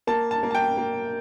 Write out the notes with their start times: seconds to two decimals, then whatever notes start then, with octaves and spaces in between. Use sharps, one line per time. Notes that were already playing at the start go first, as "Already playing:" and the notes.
0.07 A#3 A5
0.31 A5
0.43 A#3
0.51 A5
0.55 G5
0.77 A#3